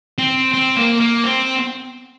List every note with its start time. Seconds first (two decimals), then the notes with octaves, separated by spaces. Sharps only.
0.19 C4
0.54 C4
0.77 A#3
1.01 A#3
1.24 C4